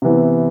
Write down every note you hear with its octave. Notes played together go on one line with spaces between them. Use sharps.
C3 E3 B3